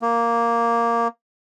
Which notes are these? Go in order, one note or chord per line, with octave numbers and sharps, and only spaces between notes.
A#3